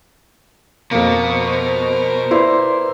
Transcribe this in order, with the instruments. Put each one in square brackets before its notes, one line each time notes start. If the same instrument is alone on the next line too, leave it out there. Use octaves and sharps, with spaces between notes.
[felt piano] F2 A#3 [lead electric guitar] B2
[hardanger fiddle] A#4 C5
[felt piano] E4 [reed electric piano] B4 D5 C6